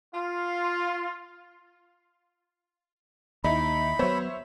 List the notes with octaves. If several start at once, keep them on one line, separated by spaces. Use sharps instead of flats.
F4
D#2 D#4 E4 B5
F#3 B3 C5 C#5 E5